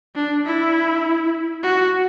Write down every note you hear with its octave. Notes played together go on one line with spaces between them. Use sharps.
D4
E4
F#4